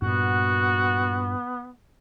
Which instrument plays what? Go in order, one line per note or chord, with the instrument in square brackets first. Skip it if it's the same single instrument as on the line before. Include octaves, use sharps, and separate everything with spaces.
[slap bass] G2 A#2 [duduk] B3 [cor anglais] F#4